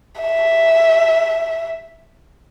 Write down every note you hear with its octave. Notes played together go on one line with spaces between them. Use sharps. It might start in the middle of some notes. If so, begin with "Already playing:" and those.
E5